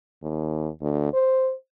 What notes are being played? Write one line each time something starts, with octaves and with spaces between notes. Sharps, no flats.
D#2
D2
C5